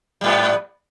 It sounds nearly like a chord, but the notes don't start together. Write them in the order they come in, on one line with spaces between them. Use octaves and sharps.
G3 G#2 B3